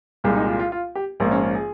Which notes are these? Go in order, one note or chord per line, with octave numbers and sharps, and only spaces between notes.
C2 A#2 G#3 F4
D#4
F4
F4
F4
G4
A#1 G#2 F3 A#3
C#4
C#4
G#4